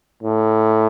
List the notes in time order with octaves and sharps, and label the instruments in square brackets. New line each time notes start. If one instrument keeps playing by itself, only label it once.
[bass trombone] A2